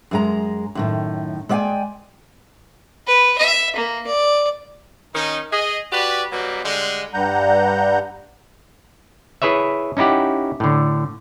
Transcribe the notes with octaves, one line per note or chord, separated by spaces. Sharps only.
F#2 G#3 A#5
F#2 A2 D#3
G#3 D5 E5 F5 G5 G#5
B4
E5
A#3
D5
D#3 C#4 D#4
G#4 D#5
F#4 G4 B4 D5
B2 F#3 G3 A#3
D3 G3 G#3
G2 G3 F#5 A#5 G6
E4 G#4 B4 C#5 E5
C#4 D#4 E4 G4 F#5
A2 D3